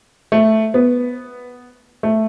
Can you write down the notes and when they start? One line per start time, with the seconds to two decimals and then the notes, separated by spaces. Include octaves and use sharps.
0.32 A3
0.74 B3
2.03 A3